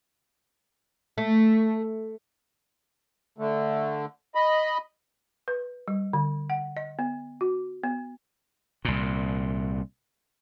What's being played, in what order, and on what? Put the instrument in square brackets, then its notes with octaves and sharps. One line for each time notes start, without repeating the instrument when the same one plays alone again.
[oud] A3
[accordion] D3 A3
D#5 B5
[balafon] B4
G3
D3
F#5
D#5
B3
F#4
B3
[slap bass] C2 A#2